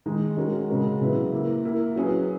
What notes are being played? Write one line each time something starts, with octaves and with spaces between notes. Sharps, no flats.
D#3 G#3 D#4
G#3 C#4 F#4 A#4
C#3 G#3 C#4 F#4 A#4
C#3 F#3 B3 E4
A#3 E4 A#4
A#3 E4 A#4
F#3 C#4 G#4 B4